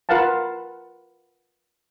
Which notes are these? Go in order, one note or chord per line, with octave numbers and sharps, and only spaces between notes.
F4 A#4 B4 F5 F#5 A5